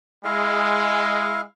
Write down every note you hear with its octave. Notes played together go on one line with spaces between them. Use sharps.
G#3 E4 F5